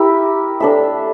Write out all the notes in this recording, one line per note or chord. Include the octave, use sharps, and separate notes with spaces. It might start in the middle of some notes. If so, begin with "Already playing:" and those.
Already playing: E4 G4 A#4 E5
D4 A4 E5